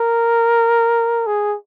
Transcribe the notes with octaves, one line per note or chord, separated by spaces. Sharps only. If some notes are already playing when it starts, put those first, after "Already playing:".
Already playing: A#4
G#4